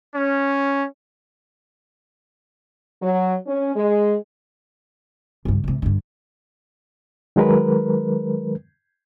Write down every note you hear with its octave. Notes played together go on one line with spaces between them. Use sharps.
C#4
F#3
C#4
G#3
C#2 G2
G#2 C3
G2 D3
D#3 F#3 G#3 A#4 B4